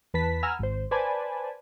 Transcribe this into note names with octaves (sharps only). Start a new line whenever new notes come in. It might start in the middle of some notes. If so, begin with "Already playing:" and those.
E2 B4 A5 B6
F#5 G#5 A#5 B5 E6 F6
G#1 C5
B4 C5 D5 G#5 A5 B5